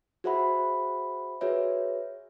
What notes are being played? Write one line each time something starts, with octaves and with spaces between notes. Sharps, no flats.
F#4 G#4 C5 E5 F#5 B5
F#4 G#4 B4 C#5 E5